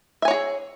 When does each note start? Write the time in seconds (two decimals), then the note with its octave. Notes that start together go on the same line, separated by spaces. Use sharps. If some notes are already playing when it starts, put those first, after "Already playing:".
0.22 E5
0.25 G#5
0.28 C#5
0.31 F#4
0.33 G#4